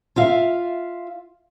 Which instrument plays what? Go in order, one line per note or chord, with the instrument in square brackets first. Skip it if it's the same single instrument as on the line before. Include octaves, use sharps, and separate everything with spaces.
[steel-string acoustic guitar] F4 E5 F5